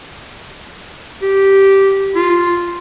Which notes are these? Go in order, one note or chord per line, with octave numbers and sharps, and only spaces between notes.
G4
F4